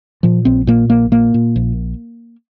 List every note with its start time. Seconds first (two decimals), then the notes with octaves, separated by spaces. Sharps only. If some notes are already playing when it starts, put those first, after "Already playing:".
0.23 A#2 F3
0.45 A#1 C4
0.67 A#2 A#3
0.90 A#1 A#3
1.12 A#2 A#3
1.34 A#2
1.56 A#1